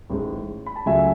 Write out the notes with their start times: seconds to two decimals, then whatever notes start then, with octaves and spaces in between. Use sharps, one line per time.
0.10 A1 G#2 G#3
0.66 B5
0.76 A5
0.86 C#2 C#3 F#3 A3 E5 G#5